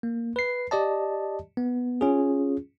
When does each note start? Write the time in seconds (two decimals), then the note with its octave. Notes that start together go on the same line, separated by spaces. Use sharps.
0.03 A#3
0.36 B4 C7
0.71 G4 D5 D#5 A5
1.57 B3
2.01 C#4 F4 G#4